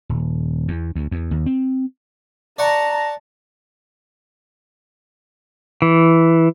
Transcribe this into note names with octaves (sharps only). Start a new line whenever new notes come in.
D#1
E2
D2
E2
D#2
C4
D5 F#5 A5 A#5 C#6
E3